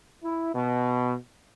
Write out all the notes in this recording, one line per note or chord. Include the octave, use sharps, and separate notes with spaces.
E4
B2